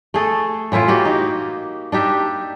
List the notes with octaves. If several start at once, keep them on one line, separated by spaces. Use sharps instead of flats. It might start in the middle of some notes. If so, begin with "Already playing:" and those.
A3 G#4 A4
A2 E3 E4 F4
A#3 F#4 G4
D#4
D4 D#4 G4 E5